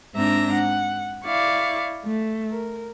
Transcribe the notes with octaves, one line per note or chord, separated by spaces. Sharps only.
G#2 C4 D4 E5 A#5 A#6
F#5
E4 D5 F5 C#6
A3
A#4